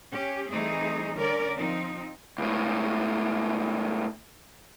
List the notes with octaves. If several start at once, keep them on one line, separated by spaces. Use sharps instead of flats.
C#4 G4
E3 G3 A3 C4 D#4 G#4
D3 C#4 A#4 D5
F3 C4 D#4
C#2 A2